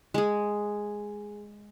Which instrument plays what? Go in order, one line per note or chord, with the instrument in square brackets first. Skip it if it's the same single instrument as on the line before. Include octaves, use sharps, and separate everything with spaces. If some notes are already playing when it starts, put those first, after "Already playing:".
[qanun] G#3 G#4